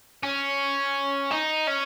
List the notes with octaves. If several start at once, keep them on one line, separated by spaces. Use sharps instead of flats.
C#4
D#4
C#4